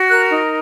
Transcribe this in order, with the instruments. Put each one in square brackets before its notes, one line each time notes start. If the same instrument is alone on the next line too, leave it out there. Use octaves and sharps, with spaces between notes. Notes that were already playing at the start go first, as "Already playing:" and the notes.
Already playing: [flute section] F#4
A#4 F#6
D#4